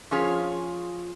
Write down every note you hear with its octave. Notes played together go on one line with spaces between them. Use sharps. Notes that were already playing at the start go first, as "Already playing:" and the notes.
F3 C#4 F4 G#4 C#5